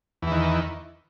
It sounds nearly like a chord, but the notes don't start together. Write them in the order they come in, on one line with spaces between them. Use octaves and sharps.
E2 E3 D#3